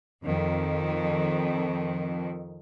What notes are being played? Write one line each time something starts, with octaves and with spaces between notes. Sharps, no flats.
F2 D#3